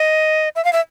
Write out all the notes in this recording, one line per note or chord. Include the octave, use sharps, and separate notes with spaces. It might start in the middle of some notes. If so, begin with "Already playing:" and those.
Already playing: D#5
E5
F5
E5